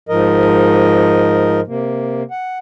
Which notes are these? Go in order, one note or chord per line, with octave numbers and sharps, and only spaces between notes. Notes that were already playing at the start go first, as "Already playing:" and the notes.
G#2 F3 A#4 D#5
C3 A#3
F#5